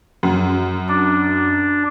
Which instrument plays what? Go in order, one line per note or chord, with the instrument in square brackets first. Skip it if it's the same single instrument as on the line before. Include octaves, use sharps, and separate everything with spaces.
[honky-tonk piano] F#2
[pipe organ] D4